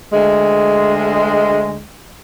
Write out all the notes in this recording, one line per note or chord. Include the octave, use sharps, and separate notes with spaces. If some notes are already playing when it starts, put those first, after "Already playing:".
D2 G#3